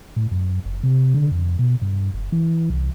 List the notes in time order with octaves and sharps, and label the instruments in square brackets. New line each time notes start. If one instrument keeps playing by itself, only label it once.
[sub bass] A2
F#2
F#1
C3
D3
F2
B2
G2
F#1
E3
C2